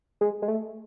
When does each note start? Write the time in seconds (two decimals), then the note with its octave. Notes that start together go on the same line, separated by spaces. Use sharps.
0.21 G#3
0.42 G#3
0.48 A3